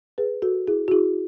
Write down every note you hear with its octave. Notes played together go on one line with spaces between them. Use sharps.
G#4 B4
F#4 A4
E4 G#4
F#4
E4 G#4